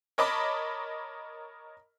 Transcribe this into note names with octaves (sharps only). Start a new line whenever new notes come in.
A#4 C#5 D#5 A5 B5 D6